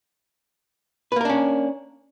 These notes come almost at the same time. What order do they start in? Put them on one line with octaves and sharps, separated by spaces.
B4 A#3 A#4 D4 C#4